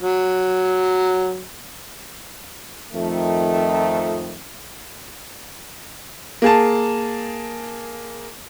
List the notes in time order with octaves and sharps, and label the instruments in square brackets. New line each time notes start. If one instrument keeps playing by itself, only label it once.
[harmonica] F#3
[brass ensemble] F2 D#3 A3
[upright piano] A#3 G#4 A5